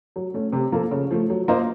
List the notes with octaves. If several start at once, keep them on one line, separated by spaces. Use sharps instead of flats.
F#3
A3 C#4
C3
F3 A#3 F4 A4
C#3
F3 A3
F#3
A#3 F4 C5 D#5